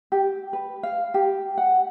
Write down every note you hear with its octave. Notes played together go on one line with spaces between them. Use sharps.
G4
B4
F5
G4
F#5